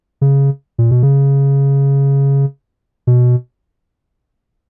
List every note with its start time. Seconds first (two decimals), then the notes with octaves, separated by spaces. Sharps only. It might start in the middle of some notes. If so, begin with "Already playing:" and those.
0.21 C#3
0.78 A#2
0.91 B2
1.03 C#3
3.07 B2